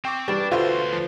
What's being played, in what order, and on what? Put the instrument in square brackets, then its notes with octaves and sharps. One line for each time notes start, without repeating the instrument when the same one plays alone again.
[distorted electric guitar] C4 [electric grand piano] G5 C#6 D6
[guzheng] E3 [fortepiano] G3 [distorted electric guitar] D4
[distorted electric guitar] D2 C6 [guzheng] B2 D3 [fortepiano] F4 [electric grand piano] F#4 A4 C5
[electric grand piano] F3